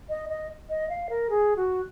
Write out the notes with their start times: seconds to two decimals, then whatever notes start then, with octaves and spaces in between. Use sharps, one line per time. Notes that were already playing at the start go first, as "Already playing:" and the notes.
0.09 D#5
0.29 D#5
0.69 D#5
0.89 F5
1.09 A#4
1.29 G#4
1.56 F#4